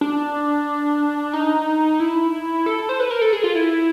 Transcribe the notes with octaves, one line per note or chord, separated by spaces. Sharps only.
D4
D#4
E4
A4
C5
B4
A#4
A4
G#4
F4
E4